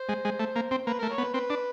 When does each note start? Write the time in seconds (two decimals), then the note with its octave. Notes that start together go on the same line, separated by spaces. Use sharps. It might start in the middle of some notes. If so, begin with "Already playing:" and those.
Already playing: C5
0.09 G#3
0.25 G#3
0.40 A3
0.56 A#3
0.71 C4
0.87 A#3 B4
0.99 A3 A#4
1.11 C#5
1.18 B3
1.23 B4
1.34 C4 B4
1.50 D4